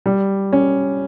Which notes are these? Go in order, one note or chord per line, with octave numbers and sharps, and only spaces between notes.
G3
C#4